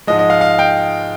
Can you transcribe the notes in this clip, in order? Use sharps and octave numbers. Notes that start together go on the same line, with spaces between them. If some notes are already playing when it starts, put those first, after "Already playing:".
G#2 F3 G#3 D#5
D#5
F5
F5
G5